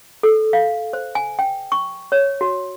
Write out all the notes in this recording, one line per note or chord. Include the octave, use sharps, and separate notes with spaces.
A4
F5
C5
G#5
G5
C#6
C#5
F#4